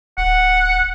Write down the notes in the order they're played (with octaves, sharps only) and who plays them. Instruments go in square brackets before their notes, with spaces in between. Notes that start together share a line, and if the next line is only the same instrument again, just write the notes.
[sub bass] D1 [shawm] F#5